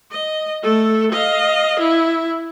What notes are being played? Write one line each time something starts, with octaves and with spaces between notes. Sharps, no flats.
D#5
A3 A4
D#5 F5
E4